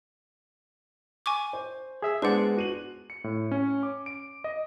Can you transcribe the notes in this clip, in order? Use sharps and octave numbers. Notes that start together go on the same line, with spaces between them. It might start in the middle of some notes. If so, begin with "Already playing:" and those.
G#5 C#6 D6
C5
G#4 E5 E6
G#3 B3 D4 B4 C5 D5 F#5
F#4 D#7 F#7
C#7
A2
C#4
D6
D7
D#5